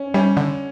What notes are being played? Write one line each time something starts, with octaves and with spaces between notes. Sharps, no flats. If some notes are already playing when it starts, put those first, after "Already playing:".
Already playing: C#4
G3 C#4
D3